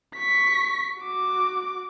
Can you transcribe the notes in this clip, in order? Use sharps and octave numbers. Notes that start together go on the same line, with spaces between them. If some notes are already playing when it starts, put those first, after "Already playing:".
C#6 B6
F#4 D6